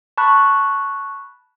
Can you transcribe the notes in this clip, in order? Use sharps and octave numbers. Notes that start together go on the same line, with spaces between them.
A5 B5 C#6 F#6